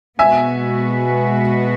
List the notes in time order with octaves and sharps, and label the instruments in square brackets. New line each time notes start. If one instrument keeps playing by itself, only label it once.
[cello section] B2 G#3 B3 F#4 B4 [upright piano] E5 G#5